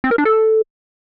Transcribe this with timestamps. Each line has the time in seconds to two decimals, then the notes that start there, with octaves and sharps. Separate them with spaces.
0.04 C4
0.11 A#4
0.18 D4
0.25 A4